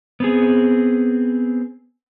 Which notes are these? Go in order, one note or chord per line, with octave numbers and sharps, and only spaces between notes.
B3 C4 G#4